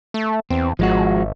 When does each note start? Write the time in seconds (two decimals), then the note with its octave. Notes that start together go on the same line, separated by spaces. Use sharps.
0.14 A3
0.50 E2 C4
0.79 G#1 F3 G#3 F#4